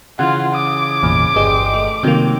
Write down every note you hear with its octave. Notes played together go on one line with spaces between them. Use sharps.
C#3 E3 F4 F#5
D6 D#6
G#1 E2 A#2
G1 G4 G#4 C5 D#5
A3
C3 D#3 F#3 A#3 C4